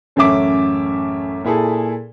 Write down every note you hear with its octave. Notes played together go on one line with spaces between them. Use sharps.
A1 F#2 A3 C#4 E5 D6
A#2 E4 G#4 A4